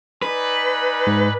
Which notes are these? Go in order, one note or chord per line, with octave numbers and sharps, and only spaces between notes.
D#4 B4 D5 G#5
G#2